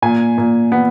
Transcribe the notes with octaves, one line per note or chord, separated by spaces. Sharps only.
A#2 G#5
A#2
B3